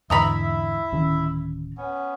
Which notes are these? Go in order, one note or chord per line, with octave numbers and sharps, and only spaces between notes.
E2 G#2 D3 E4 D#5 E5 A#5 B5
D1 D#3 C#4
B3 C#4